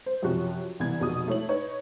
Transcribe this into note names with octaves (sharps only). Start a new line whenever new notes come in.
C5
F#2 C3 F3 F#4
C2 E3 B3 G#6
F1 B2 G#4 D#6
A3 E4 C#5 F#7
D#4 B4 C#5